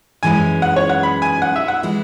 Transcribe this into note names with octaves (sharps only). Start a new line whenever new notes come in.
F#2 E3 G#3 C#4 E4 G#5
F#5
C#5
F#5
B5
G#5
F#5
E5
F#5
E3 G#3 E4